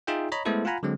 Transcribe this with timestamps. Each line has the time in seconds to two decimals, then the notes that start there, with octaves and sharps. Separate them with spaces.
0.07 D#4 F4 G#4 E5 G5
0.32 C#5 D#5 A#5 B5
0.45 G#3 A3 B3 E4 A4 C5
0.65 F4 F5 F#5 G#5 A#5 B5
0.83 D3 F#3 G#3 C4